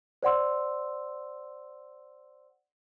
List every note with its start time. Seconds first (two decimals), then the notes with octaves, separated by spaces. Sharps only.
0.23 C5 D5 F#5 C6 E6